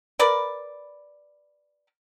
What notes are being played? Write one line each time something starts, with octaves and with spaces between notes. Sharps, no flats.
A#4 B4 D5